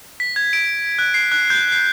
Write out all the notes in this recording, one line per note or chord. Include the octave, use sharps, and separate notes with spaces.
B6
G#6
D7
F#6
C7
F#6
G6
C7